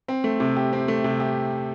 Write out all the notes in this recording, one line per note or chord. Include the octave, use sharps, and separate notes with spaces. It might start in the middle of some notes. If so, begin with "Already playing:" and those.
C4
A3
C3
G4
C4
A3
C3
G4